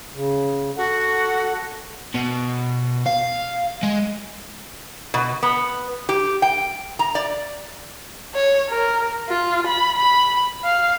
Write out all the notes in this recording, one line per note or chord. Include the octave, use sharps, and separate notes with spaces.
C#3
F#4 A4 F#5
B2
F5
G#3
B2
B3
G4
G5
A#5
D5
C#5
A#4
F4
B5
B5
F5